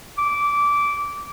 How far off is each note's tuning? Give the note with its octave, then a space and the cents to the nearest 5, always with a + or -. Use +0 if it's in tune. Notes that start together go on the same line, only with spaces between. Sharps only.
D6 -15